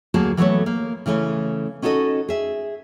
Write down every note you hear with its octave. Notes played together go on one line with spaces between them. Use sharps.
D2 F#3 A#3 F#4 G#4 A5
E3 F#3 A3 B3 A4 C#5
A#3
C#3 E3 A3 C#4
C#4 D#4 F#4 A4 D#5
G#4 E5